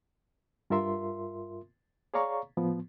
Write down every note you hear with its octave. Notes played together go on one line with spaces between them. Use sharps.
G2 F4 A#4 E5 C6
G#4 C#5 D5 F5 A#5 C#6
A2 F3 B3